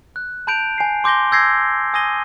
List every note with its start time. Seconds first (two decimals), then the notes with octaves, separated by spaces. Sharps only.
0.16 F#6
0.47 A5 B5 G6 D7 F7
0.78 G#5 C7
1.04 C6 D6 G6 A#6 G7
1.32 E6 G6 G#6 A#6 C7
1.94 G#5 D#6 G#6 A#6 D#7 G7